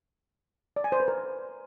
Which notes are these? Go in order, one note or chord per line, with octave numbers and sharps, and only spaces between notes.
D5
G#5
C5
B4
A#4